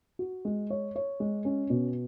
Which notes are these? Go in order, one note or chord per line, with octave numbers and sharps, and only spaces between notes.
F#4
G#3
C#5
C#5
G#3
C#4
B2